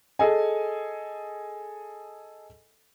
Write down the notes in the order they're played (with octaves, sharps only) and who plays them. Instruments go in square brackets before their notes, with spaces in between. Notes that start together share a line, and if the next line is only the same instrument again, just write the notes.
[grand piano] G#4 A4 D#5 G#5